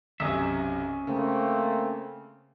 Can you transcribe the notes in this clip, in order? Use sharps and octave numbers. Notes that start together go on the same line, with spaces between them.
B1 F#2 C3 C#4 D#5 E5
C#3 A3 A#3 C4